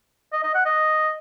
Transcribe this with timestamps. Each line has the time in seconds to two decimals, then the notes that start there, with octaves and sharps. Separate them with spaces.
0.33 D#5
0.43 D#5
0.55 F#5
0.66 D#5